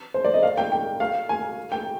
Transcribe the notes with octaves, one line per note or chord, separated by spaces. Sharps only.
C5
D5
D#5
F5
G5
G5
F5
G#5
G5